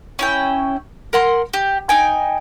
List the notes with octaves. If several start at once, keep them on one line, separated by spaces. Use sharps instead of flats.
C#4 E4 G5
A#4 F#5 C6
G4
D#4 G5 G#5